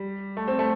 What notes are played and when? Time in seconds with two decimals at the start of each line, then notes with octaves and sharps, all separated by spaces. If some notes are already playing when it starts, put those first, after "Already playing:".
Already playing: G3
0.37 A3
0.48 C4
0.59 A3